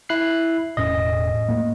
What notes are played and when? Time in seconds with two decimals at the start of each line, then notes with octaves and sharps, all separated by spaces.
0.09 E4 F#6 C7
0.77 E1 A2 C#4 D#5
1.48 A2 A3 A#3